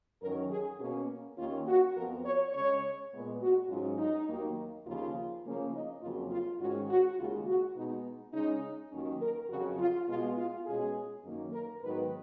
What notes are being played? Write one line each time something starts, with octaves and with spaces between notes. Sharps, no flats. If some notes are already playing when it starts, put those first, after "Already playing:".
F#2 D#3 F#3 C#4 A#4
G#4
B2 A#3 C#4
D#2 D#3 A#3 C#4 F4
F#4
F2 F3 B3 A#4
C#5
C#3 G#3 C#4 C#5
A#2 G#3 B3
F#4
G#2 F#3 C#4 F4
D#4
D#2 D#3 F#3 A#3
D#2 C#3 F3 A#3 F4
C#3 F3 A#3 C#4
D#4
F2 C#3 F#3 A#3 F4
F4
G#2 D#3 G#3 C#4 F#4
F#4
D#2 C#3 G#3 F4
F#4
B2 G#3 B3 D#4
C#3 G#3 C#4 D#4
D#2 D#3 F#3 A#3 C#4
A#4
F2 C#3 F#3 F#4
F4
B2 G#3 B3 F4
F4
B2 G#3 C#4 G#4
F#2 D#3 A#3
A#4
G#2 D#3 F#3 B3 B4